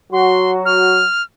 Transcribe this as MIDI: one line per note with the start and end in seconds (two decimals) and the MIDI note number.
0.12 1.07 54
0.12 1.04 66
0.12 0.51 84
0.65 1.22 89